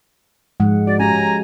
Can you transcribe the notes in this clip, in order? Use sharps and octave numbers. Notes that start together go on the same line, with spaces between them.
G#2 F3 G#3 F#5
F#4 D5
C#4 G4 G#5 A#5